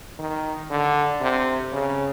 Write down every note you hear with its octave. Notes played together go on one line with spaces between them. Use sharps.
D#3
D3
C3
C#3